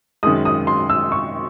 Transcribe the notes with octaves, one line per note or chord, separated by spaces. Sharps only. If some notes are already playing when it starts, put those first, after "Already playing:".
F#2 D#3 G#3 D#6
D#6
C6
E6
C#6